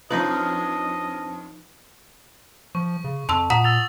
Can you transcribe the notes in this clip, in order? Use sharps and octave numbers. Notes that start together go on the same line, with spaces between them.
F2 F3 D4 D#4 B4 C5 D#5 A5
F3 C#6
C#3
F2 A5 C6 E6
A#2 F#5 A#5 D#6 B6
E6 A6 F7